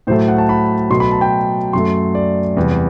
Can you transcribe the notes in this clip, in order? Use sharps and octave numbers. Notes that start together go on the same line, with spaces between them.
A2 F#3 A3 C5
F#5
A5
B5
B2 F#3 A3 C6
B5
A5
G5
F#2 F#3 A3 C6
D5
E2 C3 G3